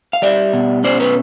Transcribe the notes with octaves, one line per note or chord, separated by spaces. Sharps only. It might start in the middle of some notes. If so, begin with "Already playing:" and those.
F5
G3 D5 E5
B2
C#4 C5 D5
B4 C#5